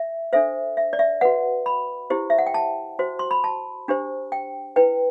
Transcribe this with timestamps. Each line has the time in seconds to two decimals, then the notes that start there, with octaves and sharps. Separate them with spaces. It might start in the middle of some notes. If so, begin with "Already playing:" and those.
Already playing: E5
0.33 D4 A4 C5 E5
0.77 E5
0.93 D5
0.99 E5
1.21 F#4 B4 F#5
1.66 B5
2.10 E4 G4 C5
2.30 E5
2.38 F#5
2.47 G5
2.54 A5
2.99 F#4 C5
3.19 C6
3.31 B5
3.44 A5
3.88 D4 G4 C5
4.32 G5
4.76 E4 B4 G5